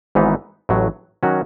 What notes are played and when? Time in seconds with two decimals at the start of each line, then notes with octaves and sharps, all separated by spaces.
0.15 G#1 G#2 E3 B3 D#4
0.69 A1 A2 F#3
1.23 D#3 F#3 C#4 F#4